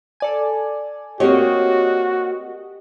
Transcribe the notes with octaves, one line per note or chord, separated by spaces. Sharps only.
A4 D5 G#5
A#3 C4 F#4 G4 C#5 D#5